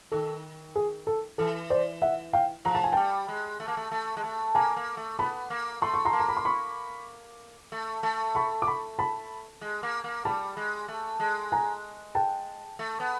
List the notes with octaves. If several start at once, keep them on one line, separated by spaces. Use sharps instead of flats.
D#3 A4
G#4
A4
E3 A4
C5 D5
E5 F#5
F5 G5
F3 A#5
A5
G#5
G3 G5 A5
G#3
A3
A#3
A3
A3
G#3
A3
A#3 G#5 A#5
A#3
A3
B3 A5 B5
A#3
A3 C6
C#6
A#5 C6
A#3
A#5
B5
C6
B5 C#6
A3
A3
B5 C#6
D6
B5 C#6
A5 B5
G#3
A#3
A#3
G3 A5 B5
G#3
A3
G#3
G#5 A#5
G5 A5
A3
B3